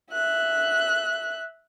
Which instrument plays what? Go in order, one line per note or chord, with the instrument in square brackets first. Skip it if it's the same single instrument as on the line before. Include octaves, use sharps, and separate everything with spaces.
[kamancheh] E5 F#6